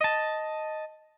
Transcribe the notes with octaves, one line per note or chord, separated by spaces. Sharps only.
D#5 A5